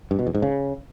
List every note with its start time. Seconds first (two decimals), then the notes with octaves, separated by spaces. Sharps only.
0.11 G2
0.19 B2
0.27 E2
0.35 G#2
0.42 C#3